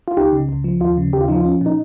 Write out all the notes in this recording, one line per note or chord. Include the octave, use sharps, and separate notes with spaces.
F4
C#2 D#4 G4
C#3
C#2
F3
D#2 F4
C#3
D#2 G4
F4
F3 D#4
F4
C#4
A#2 D#4